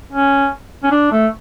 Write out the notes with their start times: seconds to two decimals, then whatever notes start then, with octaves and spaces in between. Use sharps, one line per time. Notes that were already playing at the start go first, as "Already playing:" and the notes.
0.13 C#4
0.83 C#4
0.91 D4
1.12 A3